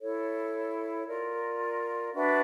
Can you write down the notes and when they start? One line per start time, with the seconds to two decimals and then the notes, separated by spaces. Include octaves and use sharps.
0.01 E4 A4 C#5
1.06 F4 A#4 D5
2.13 D4 F#4 B4 E5